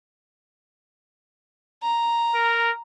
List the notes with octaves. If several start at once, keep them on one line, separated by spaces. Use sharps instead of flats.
A#5
A#4